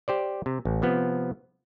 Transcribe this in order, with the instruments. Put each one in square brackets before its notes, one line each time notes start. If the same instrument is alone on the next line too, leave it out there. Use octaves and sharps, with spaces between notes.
[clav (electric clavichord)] G4 C5 D5
C3
A1
C3 F3 B3